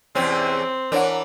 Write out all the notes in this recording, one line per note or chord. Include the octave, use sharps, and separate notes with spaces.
E2 C3 C4 C#4
E3 D4 A#4 C#5 F#5